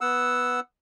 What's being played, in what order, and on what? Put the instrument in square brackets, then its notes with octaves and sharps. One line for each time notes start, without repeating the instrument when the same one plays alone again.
[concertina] B3 F#5 E6